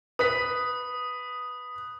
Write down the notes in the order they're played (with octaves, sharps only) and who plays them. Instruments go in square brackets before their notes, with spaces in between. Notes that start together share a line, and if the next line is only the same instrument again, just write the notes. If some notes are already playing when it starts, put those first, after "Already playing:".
[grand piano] B4 B6 [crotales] D#6